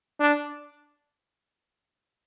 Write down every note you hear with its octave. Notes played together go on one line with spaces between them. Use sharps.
D4